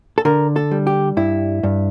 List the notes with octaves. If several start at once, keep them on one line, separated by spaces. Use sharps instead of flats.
A4
D3 A#4
A4
G3
G4
G2 E4
G2